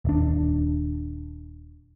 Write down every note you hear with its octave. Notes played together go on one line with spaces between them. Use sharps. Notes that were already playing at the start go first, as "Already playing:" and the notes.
D#1 D4